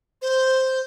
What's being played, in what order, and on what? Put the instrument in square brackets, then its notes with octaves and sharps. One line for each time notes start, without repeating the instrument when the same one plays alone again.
[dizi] C5